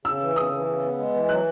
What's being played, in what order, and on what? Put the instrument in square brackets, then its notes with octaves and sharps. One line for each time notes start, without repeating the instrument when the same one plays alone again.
[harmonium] C#3 [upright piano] E6
[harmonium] E3
[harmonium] C#3 [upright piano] D#6
[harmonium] E3
C#3
B3
G#3
E3
[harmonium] F#3 [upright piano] F#6